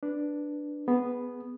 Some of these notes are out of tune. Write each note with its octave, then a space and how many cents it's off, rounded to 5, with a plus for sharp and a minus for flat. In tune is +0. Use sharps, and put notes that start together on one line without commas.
D4 +0 B4 +0
B3 +0 G#4 +0